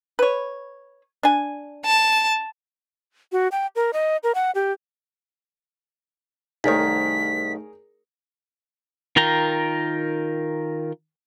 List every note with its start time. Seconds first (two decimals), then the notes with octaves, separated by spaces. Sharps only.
0.19 B4 C#5
1.23 D4 G#5
1.85 A5
3.32 F#4
3.52 G5
3.76 A#4
3.93 D#5
4.23 A#4
4.35 F#5
4.55 G4
6.64 C2 D#3 A3 D#4 G#4 A#4 C#5 B6
9.16 D#3 F4 A#4 G5 A#5